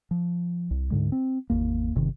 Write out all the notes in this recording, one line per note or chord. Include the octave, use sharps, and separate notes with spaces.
F3
C2
D2 G#2 D3 G#3
C4
G#1 E2 A#3
G1 C3 D#3